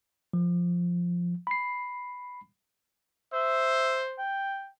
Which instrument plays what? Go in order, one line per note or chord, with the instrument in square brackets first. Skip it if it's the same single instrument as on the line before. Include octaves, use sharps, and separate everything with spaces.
[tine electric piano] F3
B5 C7
[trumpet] C5 [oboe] E5
[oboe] G5